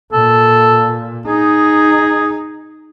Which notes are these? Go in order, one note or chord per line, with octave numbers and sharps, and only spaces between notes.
A#2 A4
D#4 G#4